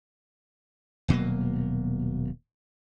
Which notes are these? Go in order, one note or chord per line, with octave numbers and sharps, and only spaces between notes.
D#1 B2 F#3 A#3